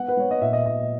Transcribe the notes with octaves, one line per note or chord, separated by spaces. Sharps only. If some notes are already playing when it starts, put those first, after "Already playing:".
Already playing: B3 F#5
B4
B3 C#5
D#5
A#2 E5
D#5
A#2 D#5